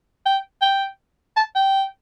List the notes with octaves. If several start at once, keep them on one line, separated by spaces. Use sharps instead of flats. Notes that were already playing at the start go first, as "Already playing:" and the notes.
G5
G5
A5
G5